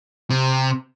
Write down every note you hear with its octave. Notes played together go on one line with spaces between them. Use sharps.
C3